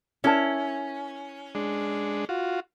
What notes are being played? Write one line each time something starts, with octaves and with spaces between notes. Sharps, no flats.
C#4 E4 A#4 A5
G#3 D4
F4 F#4